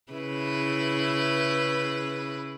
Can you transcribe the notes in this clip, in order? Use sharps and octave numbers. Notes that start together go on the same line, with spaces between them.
C#3 E4 B4